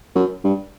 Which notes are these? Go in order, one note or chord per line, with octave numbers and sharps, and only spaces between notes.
F#2
G2